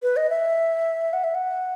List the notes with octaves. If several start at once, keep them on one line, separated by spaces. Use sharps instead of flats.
B4
D#5
E5
F#5
E5
F#5